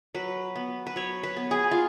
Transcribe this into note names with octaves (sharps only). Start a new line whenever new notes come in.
F#3 B4
B3
B4
F#3 C#5
B4
B3
G#4
F4